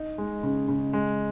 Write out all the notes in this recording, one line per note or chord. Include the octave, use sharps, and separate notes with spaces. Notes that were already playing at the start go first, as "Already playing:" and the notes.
Already playing: D#4
G#3
C#3
C#3
G#3